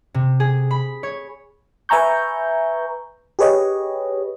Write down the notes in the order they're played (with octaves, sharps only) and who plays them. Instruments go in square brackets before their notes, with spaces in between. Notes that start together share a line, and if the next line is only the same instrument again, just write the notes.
[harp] C3
G#4
B5
C#5
[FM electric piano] B4 E5 G#5 A#5 C#6 G6
G4 G#4 B4 C#5 D#5